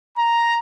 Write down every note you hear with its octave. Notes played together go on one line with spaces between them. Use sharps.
A#5